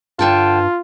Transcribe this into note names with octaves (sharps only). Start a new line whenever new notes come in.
G2 D3 F4 G5 A5